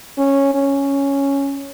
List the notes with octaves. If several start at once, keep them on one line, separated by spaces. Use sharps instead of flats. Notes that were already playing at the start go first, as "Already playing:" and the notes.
C#4
C#4